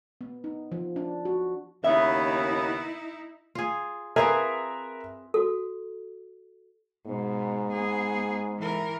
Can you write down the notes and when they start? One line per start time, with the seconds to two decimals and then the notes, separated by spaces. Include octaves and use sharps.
0.21 B3
0.44 D#4
0.72 F3
0.96 D4
1.25 F#4
1.84 D#2 C#3 B3 D#4 E4 E5
3.55 F4 G#4
4.16 C4 F4 G#4 A#4 B4 E5
5.34 F#4 A4
7.06 G#2 B2
7.72 B3 G#4
8.59 E3 A#4